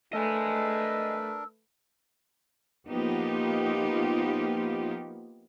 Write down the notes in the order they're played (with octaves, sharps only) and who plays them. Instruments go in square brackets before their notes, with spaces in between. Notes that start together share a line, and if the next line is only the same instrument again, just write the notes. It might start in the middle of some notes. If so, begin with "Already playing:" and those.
[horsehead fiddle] A3 B4 [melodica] D4 A#4 [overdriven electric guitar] D#5 G#5 [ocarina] E6
[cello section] F3 A#3 B3 D#4 F4 G4